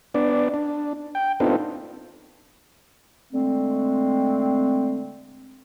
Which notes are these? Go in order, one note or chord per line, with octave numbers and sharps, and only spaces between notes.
B3 D4 D5
D4
G5
B3 C4 D4 D#4 F4 A4
D3 G#3 A3 C4